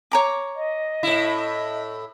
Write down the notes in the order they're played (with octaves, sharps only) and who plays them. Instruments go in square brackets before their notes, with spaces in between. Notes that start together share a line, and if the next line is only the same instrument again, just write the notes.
[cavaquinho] C#5 A#5 D6
[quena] D#5
[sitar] A2 E4